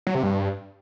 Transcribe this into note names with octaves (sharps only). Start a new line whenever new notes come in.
F#3
C3
G2